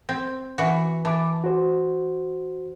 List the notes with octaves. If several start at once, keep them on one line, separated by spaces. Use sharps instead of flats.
C4
E3 F#4
E3 A5 D6
F#4 C5